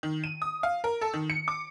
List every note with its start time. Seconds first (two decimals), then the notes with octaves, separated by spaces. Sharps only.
0.03 D#3
0.24 D#7
0.42 D#6
0.63 F5
0.84 A#4
1.01 A4
1.14 D#3
1.30 C#7
1.48 D6